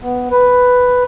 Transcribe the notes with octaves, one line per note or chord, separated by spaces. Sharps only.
B3
B4